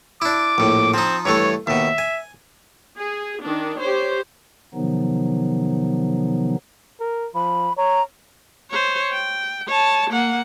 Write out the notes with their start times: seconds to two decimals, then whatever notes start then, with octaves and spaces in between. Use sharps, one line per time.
0.22 D4 E4 D6
0.58 A#1 A2
0.94 F3 C4 D#4
1.25 G2 E3 A3 C#5
1.67 D#2 B2 E5
1.98 G#5
2.97 G#4
3.43 D#3 D4
3.80 G4 C5 C#5
4.74 C3 D#3 F3 F#3 B3 D#4
7.00 A#4
7.35 F3 B5
7.77 C#5 A#5
8.71 C5 C#5
9.13 G5
9.68 C#5 A5
10.10 A#3 F#5